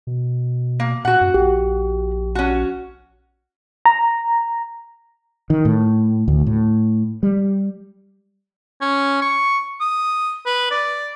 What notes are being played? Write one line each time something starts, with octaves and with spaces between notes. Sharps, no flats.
B2
A#3
A#2 F#4 F#5
F#2
A#1 G4
C#4 F#4
A#5
D#3
A2
D2
A2
G3
C#4
C#6
D#6
B4
D5